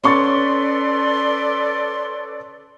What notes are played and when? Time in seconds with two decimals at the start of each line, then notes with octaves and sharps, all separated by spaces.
0.04 C#4 A4 B4 D5 C6 C#6 A6